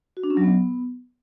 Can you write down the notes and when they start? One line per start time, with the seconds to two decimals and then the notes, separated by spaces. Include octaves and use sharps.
0.17 F#4
0.23 D4
0.30 C#4
0.37 F#3
0.44 B3